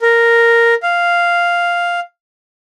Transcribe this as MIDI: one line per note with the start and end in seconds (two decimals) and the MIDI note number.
0.02 0.74 70
0.83 2.00 77